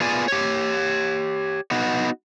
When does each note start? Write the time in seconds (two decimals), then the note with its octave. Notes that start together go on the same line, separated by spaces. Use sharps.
0.01 B3 F4 G#4 D5 G#5
0.28 G4 C#5
1.71 B3 D#4 F#4